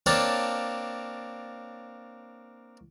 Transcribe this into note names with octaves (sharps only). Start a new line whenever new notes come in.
A#3 C4 D4 C#5 F5 A5